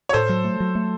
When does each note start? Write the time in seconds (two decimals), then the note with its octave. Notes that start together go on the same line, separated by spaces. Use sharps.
0.09 C#5
0.13 A2 A4 C5
0.29 F#3
0.44 A3
0.60 F#3
0.75 A3